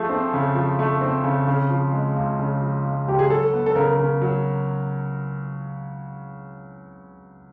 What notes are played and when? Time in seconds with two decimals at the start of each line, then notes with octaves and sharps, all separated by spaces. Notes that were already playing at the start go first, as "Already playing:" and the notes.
Already playing: F3 A3 G#4
0.09 C4
0.33 C#3
0.55 F3
0.79 A3
1.01 C4
1.24 C#3
1.47 C#3
1.70 F3
1.92 G#3
2.16 C#2
2.39 C#3
2.62 F3
2.85 G#3
3.07 C#2 G4
3.19 G#4
3.30 F#3 A4
3.53 B3
3.66 A4
3.75 C#3 A#4
3.99 C#3
4.22 F#3